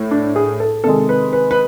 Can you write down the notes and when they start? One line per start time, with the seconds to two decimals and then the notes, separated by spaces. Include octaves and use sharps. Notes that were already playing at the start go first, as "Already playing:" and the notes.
Already playing: A2
0.11 D4
0.36 G#4
0.60 A4
0.84 C3 D#3 G#3 A4
1.09 B4
1.33 B4
1.51 B4